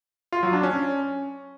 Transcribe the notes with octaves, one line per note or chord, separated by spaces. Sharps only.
F4
F#3
D4
C#4